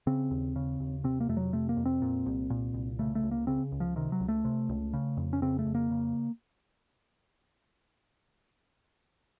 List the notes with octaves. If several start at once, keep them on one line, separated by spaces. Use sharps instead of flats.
C#3 C4
D#2
C#3
D#2
C3 C4
A#3
F2 A3
F#3
C3 A3
A#3
F2
C4
A#2
C2
A#2
C2
C#3 A3
A3
C#2
A#3
C#3 C4
C#2
F3
C3 D#3
F#3
C#2
A3
C3
C#2
C#3
F2
C#4
C#3 C4
A3
F2
A#3
C#3